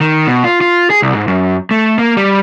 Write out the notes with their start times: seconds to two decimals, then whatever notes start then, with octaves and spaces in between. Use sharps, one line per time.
0.01 D#3
0.27 B2
0.44 F4
0.61 F4
0.90 G#4
1.02 C2
1.15 G#2
1.28 F#2
1.71 A3
1.99 A#3
2.17 G3